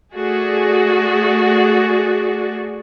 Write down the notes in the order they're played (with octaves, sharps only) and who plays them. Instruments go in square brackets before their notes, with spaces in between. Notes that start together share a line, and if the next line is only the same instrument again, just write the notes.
[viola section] A3 F#4 G#4 D5